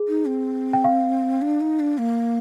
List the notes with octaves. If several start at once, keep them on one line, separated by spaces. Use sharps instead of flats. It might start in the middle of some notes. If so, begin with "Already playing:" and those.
Already playing: G#4
D#4
C4
G5
F5
D4
D#4
D4
A#3